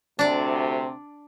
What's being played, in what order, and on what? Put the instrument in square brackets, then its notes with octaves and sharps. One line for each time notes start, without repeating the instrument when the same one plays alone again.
[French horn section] D2 C3 [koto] D4 D5